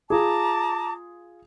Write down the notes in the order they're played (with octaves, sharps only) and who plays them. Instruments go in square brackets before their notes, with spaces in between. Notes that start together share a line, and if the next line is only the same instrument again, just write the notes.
[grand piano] F4 G#4 [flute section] A5 A#5 D6